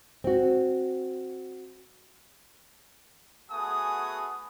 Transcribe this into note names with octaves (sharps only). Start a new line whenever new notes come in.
C4 F#4
A3 B3 F#4 G#4 G#5 D#6